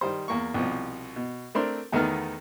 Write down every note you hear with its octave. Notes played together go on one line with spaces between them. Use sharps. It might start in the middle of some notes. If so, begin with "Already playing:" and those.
D#3 G3 C5
E2 A#3 C#6
C2 B2 F3
B2
A3 C4 D4 A#4 C6
E2 D#3 A3 B3 D#4 F6